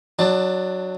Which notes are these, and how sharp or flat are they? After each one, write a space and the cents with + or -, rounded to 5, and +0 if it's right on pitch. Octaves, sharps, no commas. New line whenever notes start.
F#3 +0 D4 +25 A5 +10